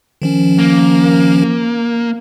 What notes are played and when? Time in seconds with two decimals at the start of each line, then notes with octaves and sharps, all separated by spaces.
0.22 D#3 F3 C#4
0.58 A#3